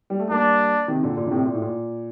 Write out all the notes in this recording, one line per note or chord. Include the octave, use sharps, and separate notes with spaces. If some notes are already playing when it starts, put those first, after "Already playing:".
G3
A3
G3 A#3 D4
C3 D#3
A#2 D3
A#2
D3
A2 C3
A#2
A2
A#2